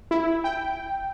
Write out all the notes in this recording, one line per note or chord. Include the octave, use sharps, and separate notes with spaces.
E4
G5